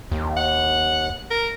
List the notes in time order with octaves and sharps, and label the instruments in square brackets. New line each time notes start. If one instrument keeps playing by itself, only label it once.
[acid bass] D#2
[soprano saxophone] F#5
A#4